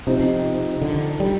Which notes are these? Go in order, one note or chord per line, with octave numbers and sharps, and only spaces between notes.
C3 F3 C4 D#4
D3
G3